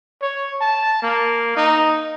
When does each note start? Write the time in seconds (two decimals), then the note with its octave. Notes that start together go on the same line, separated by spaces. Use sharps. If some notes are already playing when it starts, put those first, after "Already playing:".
0.22 C#5
0.61 A5
1.02 A#3
1.56 D#4